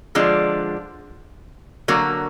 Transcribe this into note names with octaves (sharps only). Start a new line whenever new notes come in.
D3 F3 G#3 D4
D3 F#3 A#3